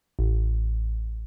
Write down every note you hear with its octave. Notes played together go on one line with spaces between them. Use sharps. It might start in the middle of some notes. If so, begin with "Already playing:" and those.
A1